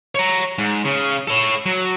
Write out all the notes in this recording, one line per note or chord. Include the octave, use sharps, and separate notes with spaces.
C#5 A#5
G#2
C#3
A4 C#5
F#3